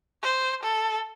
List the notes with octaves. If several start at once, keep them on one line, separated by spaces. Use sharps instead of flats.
C5
A4